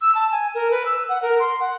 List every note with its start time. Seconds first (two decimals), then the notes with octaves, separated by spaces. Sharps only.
0.01 E6
0.15 A5
0.32 G#5
0.55 A#4
0.71 B4
0.85 E6
1.09 F#5
1.22 A#4
1.40 C6
1.60 F#5